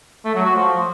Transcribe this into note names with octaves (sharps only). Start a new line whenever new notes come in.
A3
F#3
F#4
F3